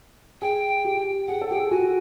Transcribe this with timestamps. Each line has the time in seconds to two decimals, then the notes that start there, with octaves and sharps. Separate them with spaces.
0.42 G#4 G5
0.85 G4
1.27 G#4 F#5
1.41 A4
1.49 G4 G5
1.56 G#4
1.70 F#4 G#5